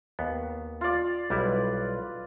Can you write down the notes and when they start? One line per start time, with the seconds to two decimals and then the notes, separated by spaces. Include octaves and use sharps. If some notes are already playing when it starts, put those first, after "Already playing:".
0.19 D#2 B3
0.81 F4 D5
1.30 B1 G3 E4 B4